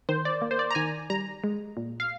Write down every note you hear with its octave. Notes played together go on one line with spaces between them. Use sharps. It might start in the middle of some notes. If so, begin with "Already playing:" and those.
D#3 C5
D5
A#3
C5
D5
A#5
D#3 G#5
G3 A#5
G#3
A#2
F5